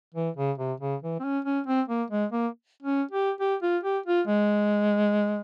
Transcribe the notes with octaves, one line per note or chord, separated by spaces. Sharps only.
E3
C#3
C3
C#3
E3
C4
C#4
C#4
C4
A#3
G#3
A#3
C#4
G4
G4
F4
G4
F4
G#3